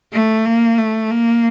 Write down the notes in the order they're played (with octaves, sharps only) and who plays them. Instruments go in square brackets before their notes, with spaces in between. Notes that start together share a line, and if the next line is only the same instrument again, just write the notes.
[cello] A3
A#3
A3
A#3